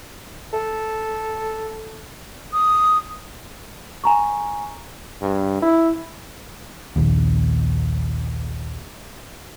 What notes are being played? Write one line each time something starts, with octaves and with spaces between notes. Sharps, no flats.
A4
D#6
G#5 A#5 C#6
G2
E4
A#1 D#2